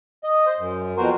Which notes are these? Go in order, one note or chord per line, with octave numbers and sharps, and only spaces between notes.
D#5
C5
F#2
F2 B2 F#4 A#4 C5